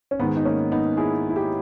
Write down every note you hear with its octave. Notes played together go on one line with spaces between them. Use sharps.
C#4
G#2 D#3 G#3 B3
D#4
A#3 C#4
B3 D#4
E4 G#4
E4
D#4 G4